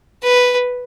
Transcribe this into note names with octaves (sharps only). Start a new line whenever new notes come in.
B4